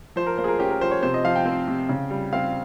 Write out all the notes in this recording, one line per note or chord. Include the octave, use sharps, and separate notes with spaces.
F3 C5
A#4
A#3 C5
G#4
A#4
C#4 G4
A#4
F3 C5
C#5
C3 C5
D#5
F3 F5
G5
C4
C3
C#3
G3
C4 F5